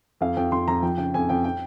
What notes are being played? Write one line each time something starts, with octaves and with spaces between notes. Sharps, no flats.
F2 F5
F2 G5
F2 C6
F2 A#5
F3 G5
C#3 G5
F2 G#5
F2 G5
G5